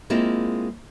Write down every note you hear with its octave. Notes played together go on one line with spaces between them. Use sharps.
G#3 A#3 C4 E4 F4